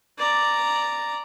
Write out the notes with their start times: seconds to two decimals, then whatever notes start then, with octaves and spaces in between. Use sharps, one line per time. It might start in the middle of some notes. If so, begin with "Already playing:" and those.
0.19 D5 A#5